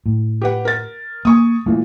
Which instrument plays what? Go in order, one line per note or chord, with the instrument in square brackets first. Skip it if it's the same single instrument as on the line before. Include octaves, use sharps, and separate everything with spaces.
[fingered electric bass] A2
[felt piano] G4 B4 F#5
A#4 A6
[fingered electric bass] A#3 [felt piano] G#5 C#6 D#6
[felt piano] A#2 E3 [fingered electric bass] G#3 A3